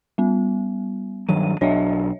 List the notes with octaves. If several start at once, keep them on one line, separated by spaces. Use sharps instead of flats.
G3 B3
G2 D#3 F#3 D#7
B1 F#3 D4 C#5 D#5 E5